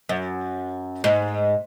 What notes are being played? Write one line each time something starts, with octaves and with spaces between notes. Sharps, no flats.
F#2
G#2